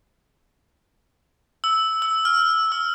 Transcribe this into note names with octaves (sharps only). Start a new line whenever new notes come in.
E6
E6
F6
E6